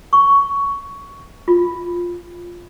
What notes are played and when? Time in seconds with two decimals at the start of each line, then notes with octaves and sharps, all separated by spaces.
0.13 C#6
1.48 F4